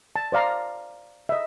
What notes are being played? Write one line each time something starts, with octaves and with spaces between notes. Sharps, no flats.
A5
C5 D5 F5 A#5
D#5 E5